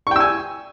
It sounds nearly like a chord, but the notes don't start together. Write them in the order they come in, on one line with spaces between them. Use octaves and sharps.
C#6 G5 E6 G#5